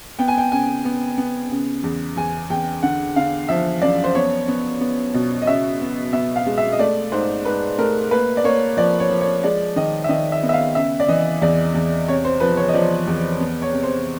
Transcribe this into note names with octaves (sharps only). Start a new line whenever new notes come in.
B3 G5
G#5
G5
C#3 G#5
B3
B3
C#3
E2
E2 G#5
E2 G5
D3 F#5
D3 F5
F3 E5
F#2 D5
C5
B3 C#5
B3
B3
B2
D#5
C#3 E5
B3
B3 E5
F5
G#3
E5
D#5
A3 D5
G#2 C5
G#2 B4
A3 A#4
A#3 B4
D5
A#3 C#5
F3 D5
C#5
F3
C#5
G#3 D5
D#3 D#5
E5
D#3 D#5
E5
B3
E5
F5
C#3 E5
D5
E3 D#5
E2 D5
E2
C3 C#5
C5
F3 B4
C#5
D#5
F3 D5
E2
B3
C#5
C3
C5